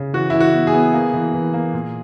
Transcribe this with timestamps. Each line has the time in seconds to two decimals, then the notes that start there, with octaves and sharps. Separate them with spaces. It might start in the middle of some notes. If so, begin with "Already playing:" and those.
Already playing: C#3
0.13 E3 F#4
0.30 E3 E4
0.41 F#4
0.54 B3
0.67 G#4
0.74 B3
0.94 A#3
1.14 E3
1.34 E3
1.54 A#3
1.73 A#2